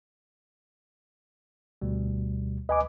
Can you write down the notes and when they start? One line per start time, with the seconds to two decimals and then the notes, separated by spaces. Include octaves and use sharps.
1.82 D2 B2 G3
2.69 D2 B4 D#5 G#5 B5 D6